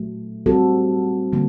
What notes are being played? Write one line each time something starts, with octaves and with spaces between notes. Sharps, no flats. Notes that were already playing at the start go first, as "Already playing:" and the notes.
Already playing: A#2 F#3 A3
G3 C4 F#4 A4
D3 G3 A#3